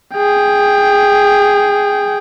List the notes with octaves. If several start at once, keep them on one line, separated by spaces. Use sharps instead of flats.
G#4 G5